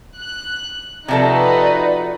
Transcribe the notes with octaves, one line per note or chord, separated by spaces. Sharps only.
F#6
C3 F3 D#4 F#4 A4 B4 D5 A#5